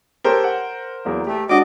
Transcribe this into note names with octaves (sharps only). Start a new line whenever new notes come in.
G4 A4 A#4 C5 C#5
F#5
E2 F#3 A#3
A3 G4
G#3 C#4 D4 F#4 D#5 F#5 D6